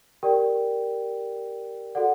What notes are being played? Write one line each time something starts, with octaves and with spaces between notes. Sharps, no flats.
G4 A#4 D5 G5
F#4 A4 D5 F#5